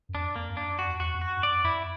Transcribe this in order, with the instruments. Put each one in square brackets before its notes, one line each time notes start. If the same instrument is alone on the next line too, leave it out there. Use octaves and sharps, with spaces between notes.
[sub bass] F#2
[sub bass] F2 [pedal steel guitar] D4
[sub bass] F2 [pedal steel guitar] A#3
[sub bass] G2
[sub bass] F#2 [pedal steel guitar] D4
[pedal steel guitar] F#4
[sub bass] E2
[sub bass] E2 [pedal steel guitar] F#4
[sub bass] F2
[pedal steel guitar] F#4
[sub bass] G2
[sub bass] F#2 [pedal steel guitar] D5
[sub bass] F2 [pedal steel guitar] E4